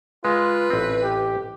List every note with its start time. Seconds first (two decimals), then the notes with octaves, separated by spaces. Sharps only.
0.25 G#3 F4 B4
0.70 A1 C4
1.03 G4